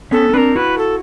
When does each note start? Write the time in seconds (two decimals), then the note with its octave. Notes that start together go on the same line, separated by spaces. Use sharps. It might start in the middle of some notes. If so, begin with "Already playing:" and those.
0.11 B3 C#4 A4
0.29 C#4
0.33 C4 D4 A#4 B4
0.56 E4 F#4 B4
0.78 A4